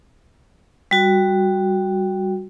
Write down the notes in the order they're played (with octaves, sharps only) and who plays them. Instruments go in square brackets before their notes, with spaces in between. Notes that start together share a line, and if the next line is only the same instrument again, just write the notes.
[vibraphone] G3 F#4